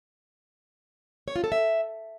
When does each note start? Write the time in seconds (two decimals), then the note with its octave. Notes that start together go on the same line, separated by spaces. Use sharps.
1.28 C#5
1.36 F4
1.44 A4
1.52 E5